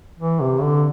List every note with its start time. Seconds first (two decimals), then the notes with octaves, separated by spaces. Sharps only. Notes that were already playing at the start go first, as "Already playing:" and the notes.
0.19 E3
0.40 C3
0.62 D3